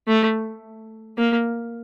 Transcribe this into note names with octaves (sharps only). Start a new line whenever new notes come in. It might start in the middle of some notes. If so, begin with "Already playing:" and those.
A3
A#3